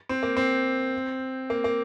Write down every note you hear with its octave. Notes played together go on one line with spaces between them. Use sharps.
C4
A#3
C4
A#3
A#3